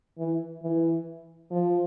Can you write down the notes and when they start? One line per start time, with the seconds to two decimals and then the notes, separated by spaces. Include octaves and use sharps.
0.18 E3
0.62 E3
1.51 F3